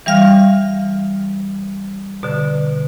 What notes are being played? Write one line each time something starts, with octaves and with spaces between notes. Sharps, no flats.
E3 G3 F5 F6
B2 D3